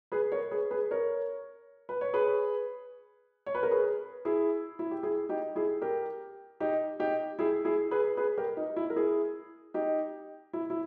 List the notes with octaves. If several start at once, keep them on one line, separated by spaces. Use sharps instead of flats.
G#4 B4
A#4 C#5
G#4 B4
G#4 B4
A#4 C#5
B4
C#5
G#4 B4
C#5
B4
A#4
G#4 B4
E4 G#4
E4
G4
E4 G#4
D#4 G4
E4 G#4
G4 A#4
D#4 G4
D#4 G4
E4 G#4
E4 G#4
G#4 B4
G#4 B4
G4 A#4
D#4
E4
A#4
E4 G#4
D#4 G4
E4
E4